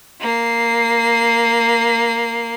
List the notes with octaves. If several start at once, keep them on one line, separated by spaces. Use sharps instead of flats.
A#3 C7